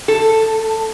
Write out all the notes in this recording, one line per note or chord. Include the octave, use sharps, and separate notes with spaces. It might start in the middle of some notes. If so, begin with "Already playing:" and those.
A4